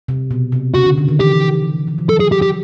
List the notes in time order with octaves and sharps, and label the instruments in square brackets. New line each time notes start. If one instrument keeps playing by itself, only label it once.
[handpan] C3
B2
C3
[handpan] C#3 [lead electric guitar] F#4
[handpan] D3
D3
D#3
[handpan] E3 [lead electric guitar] G4
[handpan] F3
E3
F3
[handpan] F#3 [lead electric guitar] A4
[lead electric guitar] G#4
G4
G4